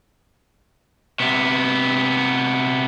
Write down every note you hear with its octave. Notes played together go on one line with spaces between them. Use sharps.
C3 B3